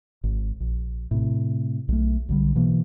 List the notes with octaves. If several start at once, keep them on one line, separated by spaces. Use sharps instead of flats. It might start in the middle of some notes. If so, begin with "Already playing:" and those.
G#1
A#1
A2 C3
B1 A3
B1 D3 G3
B2 E3 A#3